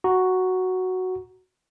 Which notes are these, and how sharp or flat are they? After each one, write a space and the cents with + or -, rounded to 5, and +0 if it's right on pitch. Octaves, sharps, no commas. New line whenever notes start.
F#4 +0 A#5 +0